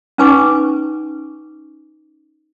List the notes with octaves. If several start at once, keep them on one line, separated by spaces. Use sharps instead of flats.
C#4 D#4 B4 G#5 C#6 D6